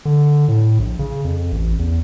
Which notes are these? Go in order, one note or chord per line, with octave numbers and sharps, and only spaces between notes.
D3
A2
A#1
C#3
F2
A1
E2